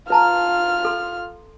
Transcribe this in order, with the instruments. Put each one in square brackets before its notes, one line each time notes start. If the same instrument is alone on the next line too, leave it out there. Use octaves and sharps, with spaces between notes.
[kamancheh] F4 F6 [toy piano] B4 A5 A#5
[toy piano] A4 C6